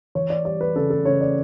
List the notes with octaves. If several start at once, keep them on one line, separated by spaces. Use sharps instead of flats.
E3 C#5
D5
G3 D5
B4
C#3 A4
A4
C#3 C#5
D5